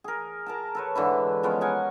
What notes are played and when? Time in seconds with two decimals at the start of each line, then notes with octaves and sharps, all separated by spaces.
0.04 G#4 A#4
0.46 A#4 A5 A#5
0.75 A4 B4 C#5
0.95 G#2 D3 E3 E4
1.43 F3 G#3 B3 C#4
1.61 G#4 A#4 F#5 G#5